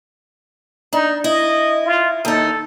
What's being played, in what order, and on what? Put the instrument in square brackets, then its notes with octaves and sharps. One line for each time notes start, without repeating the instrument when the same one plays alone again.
[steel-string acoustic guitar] D4 [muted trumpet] D#4
[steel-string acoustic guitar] E4 [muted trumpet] D#5
[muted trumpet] F4
[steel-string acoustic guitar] D#2 D#4 [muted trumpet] A4